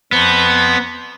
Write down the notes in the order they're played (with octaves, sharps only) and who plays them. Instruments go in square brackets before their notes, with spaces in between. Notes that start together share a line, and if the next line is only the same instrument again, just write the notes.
[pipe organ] F2 F3 [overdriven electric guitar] B3